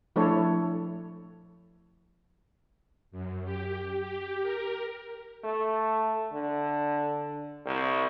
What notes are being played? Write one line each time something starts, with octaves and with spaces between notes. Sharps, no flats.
F3 A3 D4 E4 A4 C#5
F#2
G4
G4
A#4
A3
D3
C2